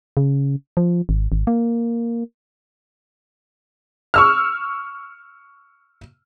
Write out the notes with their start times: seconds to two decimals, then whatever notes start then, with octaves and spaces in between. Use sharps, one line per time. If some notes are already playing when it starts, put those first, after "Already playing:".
0.17 C#3
0.77 F3
1.09 G#1
1.32 G#1
1.47 A#3
4.14 C#6 E6 F6